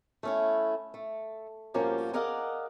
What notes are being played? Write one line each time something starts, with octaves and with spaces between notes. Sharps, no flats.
A3 C#4 E4
A3
G2 F3 A#3 C#4 F#4 G4
G#4 A#4 D5 D#5 F5 F#5